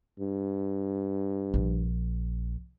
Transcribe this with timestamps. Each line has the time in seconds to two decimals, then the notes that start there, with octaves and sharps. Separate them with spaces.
0.19 G2
1.54 A#1